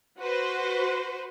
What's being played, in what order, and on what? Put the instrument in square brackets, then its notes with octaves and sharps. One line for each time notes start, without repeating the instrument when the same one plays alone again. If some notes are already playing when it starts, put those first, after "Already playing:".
[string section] F#4 B4 C5